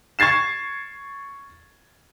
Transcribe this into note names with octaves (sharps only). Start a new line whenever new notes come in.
C#6 G#6 A6 C7 E7